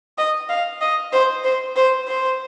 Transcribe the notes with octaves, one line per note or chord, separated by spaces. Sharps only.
D#5
F5
D#5
C5
C5
C5
C5